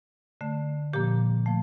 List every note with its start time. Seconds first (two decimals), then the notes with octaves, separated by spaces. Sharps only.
0.41 D3 A3
0.93 A#2 F3 A#3 G4
1.46 F3 A3